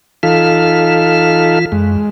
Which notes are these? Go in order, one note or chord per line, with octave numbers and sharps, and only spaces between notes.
E3 D#4 F4 A4 F5
F#2 G#3